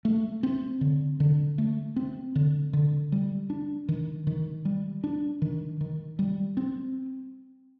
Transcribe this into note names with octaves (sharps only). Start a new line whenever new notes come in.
A3
C4
D3
D3
A3
C4
D3
D3
G3
D4
D#3
D#3
G3
D4
D#3
D#3
G3
C4